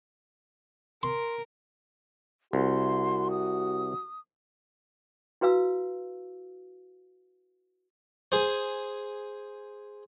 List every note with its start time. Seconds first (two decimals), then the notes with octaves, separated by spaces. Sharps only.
1.03 A#4 C6
2.53 C2 F#4 C6
3.31 D#6
5.41 E4 F#4 B4 F5 E6
8.32 G#4 C5